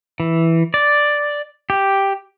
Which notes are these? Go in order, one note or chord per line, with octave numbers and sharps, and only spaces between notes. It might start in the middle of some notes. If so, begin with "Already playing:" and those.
E3
D5
G4